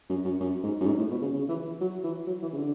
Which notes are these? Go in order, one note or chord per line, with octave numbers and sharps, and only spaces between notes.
F#2
F#2
F#2
G#2
F#2
G#2
A2
B2
C#3
C#3
E3
E3
F#3
E3
F#3
E3
C#3
D3